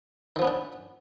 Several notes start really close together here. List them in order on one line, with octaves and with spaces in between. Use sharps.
D#3 F3 B3 C#4 D4